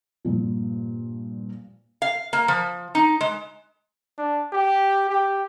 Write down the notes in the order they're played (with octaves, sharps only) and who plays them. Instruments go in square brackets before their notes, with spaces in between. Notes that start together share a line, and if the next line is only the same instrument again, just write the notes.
[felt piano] G2 A#2 F3
[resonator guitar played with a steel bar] F5
A#3
F3
D#4
G#3
[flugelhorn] D4
G4
G4